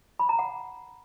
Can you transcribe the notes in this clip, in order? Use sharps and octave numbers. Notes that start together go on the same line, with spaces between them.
B5
A#5
F#5